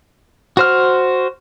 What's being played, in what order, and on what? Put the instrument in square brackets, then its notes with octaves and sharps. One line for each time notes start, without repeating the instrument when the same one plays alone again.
[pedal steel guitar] F#4 C5 F6